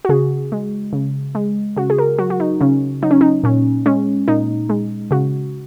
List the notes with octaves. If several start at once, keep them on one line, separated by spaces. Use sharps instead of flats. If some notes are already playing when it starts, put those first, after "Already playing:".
F#4
C#3 G#4
G#3
C#3
G#3
C#3 F#4
G#4
A#4
F#3 F#4
F#4
D#4
C#3 C#4
F#3 D#4
C#4
D#4
A#2 C#4
G#3 C#4
A#2 D#4
G#3
C#3 F#4